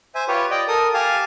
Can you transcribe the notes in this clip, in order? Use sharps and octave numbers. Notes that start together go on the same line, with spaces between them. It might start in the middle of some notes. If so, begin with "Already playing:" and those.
C5 E5 G#5
F4 G4 B4 C#5
D5 D#5 G5
A4 A#4 D#6
G4 F5 G#5 A5